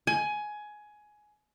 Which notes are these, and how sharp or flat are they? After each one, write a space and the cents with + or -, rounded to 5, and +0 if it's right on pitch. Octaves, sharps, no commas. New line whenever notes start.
G#5 +15